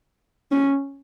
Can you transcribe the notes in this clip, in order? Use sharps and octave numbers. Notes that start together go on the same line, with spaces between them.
C#4